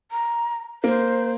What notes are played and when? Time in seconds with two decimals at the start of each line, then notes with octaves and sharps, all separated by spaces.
0.12 A#5
0.84 A#3 C5